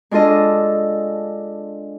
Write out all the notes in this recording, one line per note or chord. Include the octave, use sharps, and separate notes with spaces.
G#3 D4 F4 A4 D#5